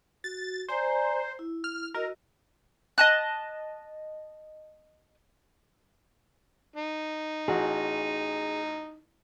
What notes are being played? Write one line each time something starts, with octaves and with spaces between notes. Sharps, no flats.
F#4 A6
C5 D5 G#5 A#5
E4
F6
F#4 A#4 D#5 E6
D#5 A5 F#6
D#4
A1 F#4 G#4